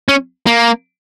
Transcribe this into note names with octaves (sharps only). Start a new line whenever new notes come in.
C#4
A#3